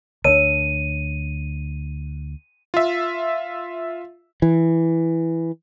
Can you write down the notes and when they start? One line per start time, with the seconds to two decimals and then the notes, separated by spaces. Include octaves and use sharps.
0.24 D2 B3 D4 A#4 C#5 A5 D#7
2.74 F4 E5
4.42 E3